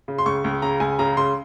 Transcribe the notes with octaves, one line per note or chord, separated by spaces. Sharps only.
C#3
C6
C#2 C#6
C#2
C#3 A#5
C#2 G#5
C#3 A#5
C#3 C6